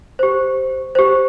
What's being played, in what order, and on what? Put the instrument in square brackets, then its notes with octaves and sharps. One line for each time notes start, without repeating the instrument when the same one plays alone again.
[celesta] G4 C5
G4 C5